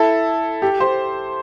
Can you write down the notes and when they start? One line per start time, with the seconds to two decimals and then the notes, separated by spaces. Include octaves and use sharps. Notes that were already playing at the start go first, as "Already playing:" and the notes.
Already playing: E4 A4
0.62 G4
0.80 G4 C5